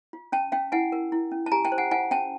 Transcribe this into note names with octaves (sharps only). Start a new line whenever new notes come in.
F4
C#4 G5 A5
C#4 F5 G5
E4 F#5 G#5
A#4
E4
C#4
A5
G4 G#5 A#5
G5 A5
C5
F#5 G#5
F4 F#5 G#5
C#4 G5 A5